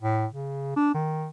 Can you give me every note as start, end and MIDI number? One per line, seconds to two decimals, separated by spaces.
0.02 0.26 45
0.33 0.75 49
0.76 0.94 62
0.94 1.27 51